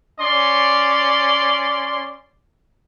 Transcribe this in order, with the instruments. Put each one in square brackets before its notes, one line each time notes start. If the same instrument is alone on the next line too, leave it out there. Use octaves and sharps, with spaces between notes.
[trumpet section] C#4 D5 C6